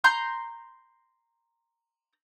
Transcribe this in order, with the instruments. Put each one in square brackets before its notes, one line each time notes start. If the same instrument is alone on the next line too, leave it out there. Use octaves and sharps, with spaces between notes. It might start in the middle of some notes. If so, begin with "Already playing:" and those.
[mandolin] A#5 C6 G6